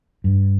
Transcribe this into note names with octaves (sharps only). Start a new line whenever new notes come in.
G2